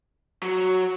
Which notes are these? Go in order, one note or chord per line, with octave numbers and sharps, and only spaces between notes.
F#3